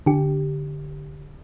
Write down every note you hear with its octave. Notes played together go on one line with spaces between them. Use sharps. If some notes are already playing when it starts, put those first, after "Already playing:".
D3 G4